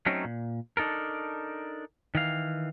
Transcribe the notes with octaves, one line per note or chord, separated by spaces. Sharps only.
F#3 A3 C4 C#4 D#4
A#2
D4 D#4 A4 A#4
D#3 E3 F5